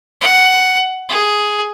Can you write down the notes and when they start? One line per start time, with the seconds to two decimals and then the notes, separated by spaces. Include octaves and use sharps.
0.21 F#5
1.09 G#4